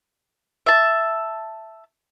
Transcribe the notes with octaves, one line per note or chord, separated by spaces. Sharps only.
E5 A5